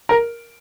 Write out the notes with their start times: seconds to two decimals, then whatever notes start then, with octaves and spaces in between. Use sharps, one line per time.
0.09 A#4